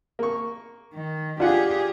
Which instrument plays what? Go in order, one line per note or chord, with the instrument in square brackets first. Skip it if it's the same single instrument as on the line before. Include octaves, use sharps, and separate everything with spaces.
[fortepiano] A#3 C#6
[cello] D#3
[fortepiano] D4 F#5 [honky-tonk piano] F4 [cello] G4 G#4